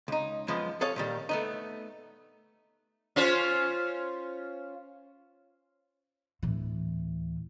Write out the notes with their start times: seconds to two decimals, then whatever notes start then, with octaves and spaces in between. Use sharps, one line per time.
0.08 C#2 D#4
0.48 F#2 F3 G#3 B3
0.81 G#4 A4 C#5 F5
0.96 A#2 D#3 G3
1.29 A3 B3 D#4
3.16 C#4 F4 C5
6.43 D1 E3